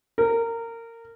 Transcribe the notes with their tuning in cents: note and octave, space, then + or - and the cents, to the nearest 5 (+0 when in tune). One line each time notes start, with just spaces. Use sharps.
A#4 -20